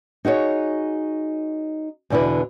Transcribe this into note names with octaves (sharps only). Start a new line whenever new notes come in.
D#4 F#4 G#4 C#5
E2 B2 D3 E4 B4